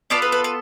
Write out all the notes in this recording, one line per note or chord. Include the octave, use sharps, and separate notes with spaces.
B3 F4 A4 B4 D5
B4
B4
B4